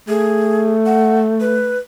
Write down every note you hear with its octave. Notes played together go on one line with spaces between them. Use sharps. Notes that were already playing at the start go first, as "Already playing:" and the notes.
A3 G#4
F#5
B4